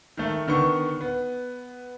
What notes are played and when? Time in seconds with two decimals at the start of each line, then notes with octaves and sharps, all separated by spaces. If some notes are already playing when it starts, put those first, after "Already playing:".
0.17 D#3 A3
0.48 D3 D#3 B3 C#6
1.01 B3